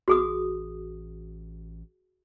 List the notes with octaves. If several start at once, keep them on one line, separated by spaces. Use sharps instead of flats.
A1 F#4 G#4 D#6